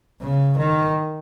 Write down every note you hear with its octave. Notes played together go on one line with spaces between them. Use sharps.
C#3
D#3